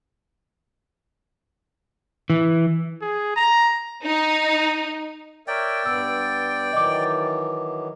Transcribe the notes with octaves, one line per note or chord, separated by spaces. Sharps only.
E3
G#4
A#5
D#4
A#4 C#5 D5 E5 G5
G2 B3 E6
D#3 E3 F#3 D#5 D6